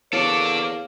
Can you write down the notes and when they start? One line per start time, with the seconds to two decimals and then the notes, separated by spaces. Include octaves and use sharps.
0.13 E2 A#3 A4 C#5 D5